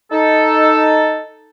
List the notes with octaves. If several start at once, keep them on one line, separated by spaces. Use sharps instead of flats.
D#4 A4